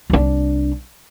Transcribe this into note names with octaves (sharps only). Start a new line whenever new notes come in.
C2 D4